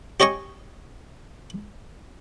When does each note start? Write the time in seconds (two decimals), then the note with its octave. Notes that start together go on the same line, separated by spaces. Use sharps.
0.20 G4 C#5 D#5 G#5 C#6